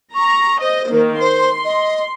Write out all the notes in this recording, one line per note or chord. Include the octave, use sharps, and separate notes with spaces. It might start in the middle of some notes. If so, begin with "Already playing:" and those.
A#5 C#6
C5 D#5
D#3 A#3
C5 C6
D#5